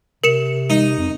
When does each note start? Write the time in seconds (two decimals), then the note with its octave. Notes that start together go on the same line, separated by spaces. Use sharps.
0.24 C3 A#4 C#7 E7
0.70 D#4
0.98 F2